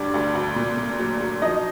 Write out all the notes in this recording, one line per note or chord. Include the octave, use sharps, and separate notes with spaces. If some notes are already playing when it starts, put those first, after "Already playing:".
Already playing: D2 G2 G3 D4 D5
D2
D2
A#2
A#2
F#3
F#3
F3 D#4 D#5